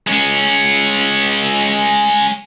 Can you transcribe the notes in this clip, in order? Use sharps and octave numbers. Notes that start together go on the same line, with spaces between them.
G#3 C#4